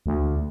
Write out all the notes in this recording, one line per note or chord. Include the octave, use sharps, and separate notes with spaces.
D2